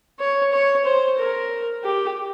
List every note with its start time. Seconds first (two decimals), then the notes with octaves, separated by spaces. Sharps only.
0.19 C#5
0.52 C#5
0.85 C5
1.19 A#4
1.84 G4